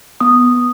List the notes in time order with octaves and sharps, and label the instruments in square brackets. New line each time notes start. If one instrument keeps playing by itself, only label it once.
[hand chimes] B3 D#6